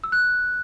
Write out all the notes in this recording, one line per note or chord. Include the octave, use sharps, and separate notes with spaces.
E6
F#6